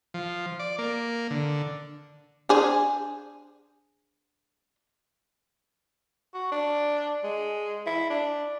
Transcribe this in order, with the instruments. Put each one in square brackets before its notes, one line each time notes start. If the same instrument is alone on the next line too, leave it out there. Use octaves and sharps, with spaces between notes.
[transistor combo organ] F3
D5
A#3
D3
[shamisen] D4 G#4 C5
[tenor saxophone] F#4
D4
G#3
E4
D4